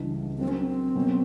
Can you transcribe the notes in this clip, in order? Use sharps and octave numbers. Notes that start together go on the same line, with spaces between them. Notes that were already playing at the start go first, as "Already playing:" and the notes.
Already playing: C#2 C#3 E3 G3 D4
F#3 A#3 C4 D4
C#4
C4
B2 F#3 A#3 C#4